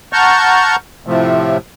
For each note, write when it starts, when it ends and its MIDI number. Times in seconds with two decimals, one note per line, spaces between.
0.13 0.76 78
0.13 0.76 81
0.13 0.76 82
0.13 0.76 85
0.13 0.76 89
0.13 0.76 91
1.07 1.57 45
1.07 1.57 48
1.07 1.57 53
1.07 1.57 57